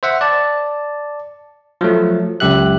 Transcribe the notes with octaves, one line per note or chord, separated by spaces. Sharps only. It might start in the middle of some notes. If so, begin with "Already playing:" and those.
C5 E5 F#5
D5 A5
F3 F#3 A3
C#2 F#2 G4 E5 F#6